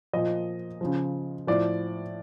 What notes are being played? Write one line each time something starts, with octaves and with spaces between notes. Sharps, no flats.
A#2 F3 D#5
C#3 F3
A2 F3 D5